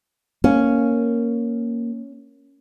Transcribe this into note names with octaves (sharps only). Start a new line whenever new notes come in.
A#3 C#4